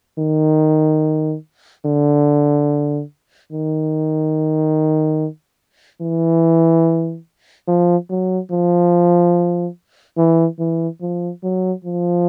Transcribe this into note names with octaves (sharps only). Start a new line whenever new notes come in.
D#3
D3
D#3
E3
F3
F#3
F3
E3
E3
F3
F#3
F3